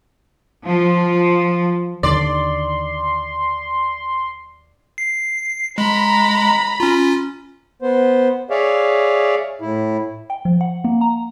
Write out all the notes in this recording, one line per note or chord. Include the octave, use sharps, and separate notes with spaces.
F3
D#2 D3 D#3 D5 C6
C7
G#3 A#5 B5
C#4 F4
B3 C5
G#4 C#5 D5 E5 F5
A2 E4
G5
F3
F#5
A#3
A#5